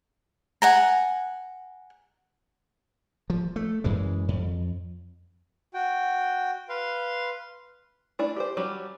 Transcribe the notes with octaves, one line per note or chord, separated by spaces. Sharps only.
F#5 G#5 A#5
F3
A3
F#2 E3 G#3
F2
F#4 G5
B4 F5 C6
A3 D4 E4
G4 B4 C5
F#3 G3 C#4 G4